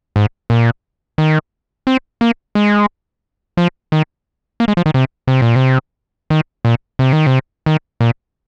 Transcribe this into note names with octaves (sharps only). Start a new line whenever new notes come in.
G#2
A#2
D#3
C4
A#3
G#3
F3
D#3
A#3
G#3
F3
D#3
C3
C3
A#2
C3
D#3
A#2
C3
D#3
C3
D#3
A#2